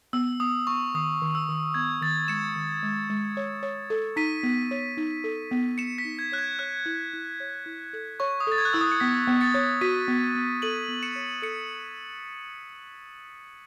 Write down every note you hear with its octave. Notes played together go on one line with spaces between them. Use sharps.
B3 E6
B3 D#6
B3 C#6
D#3 D#6
D#3
E6
D#3
B3 G#6
D#3 A6
G#3 C#7 E7
D#3
G#3
G#3
C#5
C#5
A4
D#4 B6 D#7
B3
C#5
D#4
A4
B3
B3 C#7 E7
B6
D#4
G#6
C#5 F#6
G#6
C#5 F#6
E4
E4
C#5
E4
A4
C#5 C#6
D#6
A4 A6
G#6
F#6
E4 E6
D#6
C#7
B3 B6
B3
A6 C#7
C#5
F#4 B6 D#7
B3
B3
A4 D#7 F#7
B3
C#7 E7
C#5
A4 C#7